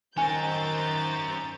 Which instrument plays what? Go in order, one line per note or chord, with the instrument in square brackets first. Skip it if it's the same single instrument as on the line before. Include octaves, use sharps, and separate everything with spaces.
[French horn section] D#3 [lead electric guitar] C#4 A#4 [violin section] C5 G6 A6 [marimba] G#5